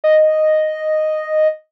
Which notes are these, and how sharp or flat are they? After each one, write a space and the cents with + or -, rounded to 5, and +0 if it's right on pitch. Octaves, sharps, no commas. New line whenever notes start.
D#5 -5